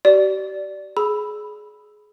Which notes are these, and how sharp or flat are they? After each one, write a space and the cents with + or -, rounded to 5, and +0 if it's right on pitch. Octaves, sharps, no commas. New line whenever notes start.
G4 -40 D5 -5
G#4 +25 B5 +0 E6 +0